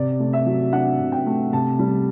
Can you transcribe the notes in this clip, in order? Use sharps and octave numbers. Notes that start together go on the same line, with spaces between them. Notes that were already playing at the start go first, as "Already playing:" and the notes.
Already playing: C3 D5
A3
E5
F#3
D4 F#5
C3
G5
A3
C3 A5
G3